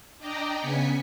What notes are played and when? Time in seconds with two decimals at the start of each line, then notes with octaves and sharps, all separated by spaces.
0.18 D4 D5 D#5 G5 A#5
0.60 C#3 B3 G#5 B6 C#7